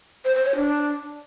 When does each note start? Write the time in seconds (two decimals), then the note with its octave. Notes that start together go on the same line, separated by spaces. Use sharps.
0.25 C5
0.35 C5
0.45 C#5
0.55 D4